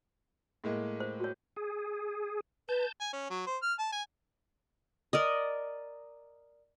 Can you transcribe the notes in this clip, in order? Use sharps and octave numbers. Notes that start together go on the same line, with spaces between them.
A2 G#3 A#3
C5
F#4 C#5
G#4
B4 A5 G6
G#5
C#4
F#3
C5
F6
A5
G#5
A#4 D5 D#5